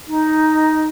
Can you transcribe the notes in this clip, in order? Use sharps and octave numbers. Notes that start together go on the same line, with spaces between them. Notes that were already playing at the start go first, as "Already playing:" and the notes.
D#4